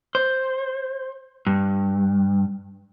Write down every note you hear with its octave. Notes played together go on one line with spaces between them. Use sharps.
C5
G2